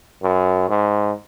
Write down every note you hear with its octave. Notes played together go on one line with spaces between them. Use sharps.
F#2
G#2